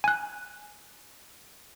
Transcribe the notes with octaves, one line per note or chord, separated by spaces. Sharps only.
G#5 F#6